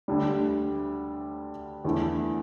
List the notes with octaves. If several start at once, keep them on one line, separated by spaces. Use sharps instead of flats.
D2 D3 G3
E2 D3 A3 E4